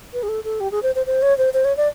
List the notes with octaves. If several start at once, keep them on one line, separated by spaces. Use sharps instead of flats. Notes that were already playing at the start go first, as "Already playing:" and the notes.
B4
G#4
A4
A4
G4
G#4
C5
C5
C5
C#5
C5
C5
C#5
D5